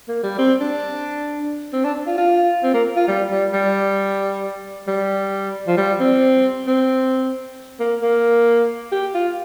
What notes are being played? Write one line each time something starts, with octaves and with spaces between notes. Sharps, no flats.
A#3
G3
C4
D4
C4
D4
F4
F4
C4
A#3
F4
G3
G3
G3
G3
F3
G3
C4
C4
A#3
A#3
G4
F4